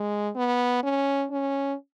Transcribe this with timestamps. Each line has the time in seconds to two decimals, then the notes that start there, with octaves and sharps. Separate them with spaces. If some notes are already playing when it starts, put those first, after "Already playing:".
Already playing: G#3
0.35 B3
0.83 C#4
1.31 C#4